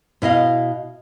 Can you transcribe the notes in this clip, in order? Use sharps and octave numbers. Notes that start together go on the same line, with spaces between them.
B2 E4 D#5 F5